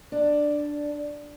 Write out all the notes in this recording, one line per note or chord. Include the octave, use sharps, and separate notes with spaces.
D4